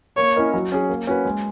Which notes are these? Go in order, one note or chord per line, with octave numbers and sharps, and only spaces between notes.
A#3 C#5
C#4 E4 A#4 D#5
F#3
C#4 G#4
A#3
C#4 F#4 B4
G#3